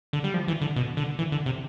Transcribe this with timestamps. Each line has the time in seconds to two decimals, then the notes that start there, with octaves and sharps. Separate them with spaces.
0.13 D3
0.24 G3
0.34 F3
0.48 E3
0.61 D3
0.76 B2
0.97 D3
1.19 E3
1.32 D3
1.46 C3